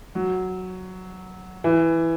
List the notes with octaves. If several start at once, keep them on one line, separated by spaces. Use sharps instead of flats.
F#3
E3